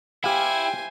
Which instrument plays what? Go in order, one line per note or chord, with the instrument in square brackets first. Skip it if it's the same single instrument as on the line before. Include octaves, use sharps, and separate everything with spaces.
[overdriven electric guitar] E4 [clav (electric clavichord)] G4 F5 [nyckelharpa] C5 G#5 [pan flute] G5